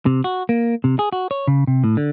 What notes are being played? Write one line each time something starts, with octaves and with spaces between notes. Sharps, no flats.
C3
F#4
A#3
C3
G#4
F#4
C#5
C#3
C3
A2
D3